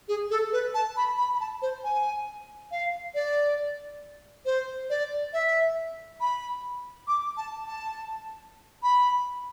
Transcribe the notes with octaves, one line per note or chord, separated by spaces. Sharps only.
G#4
A4
B4
A5
B5
B5
B5
A5
C5
G#5
F5
D5
C5
D5
E5
B5
D6
A5
A5
B5